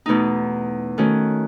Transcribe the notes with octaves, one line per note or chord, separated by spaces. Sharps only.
E2 B2 A3 D#4
D#3 A3 C#4 F#4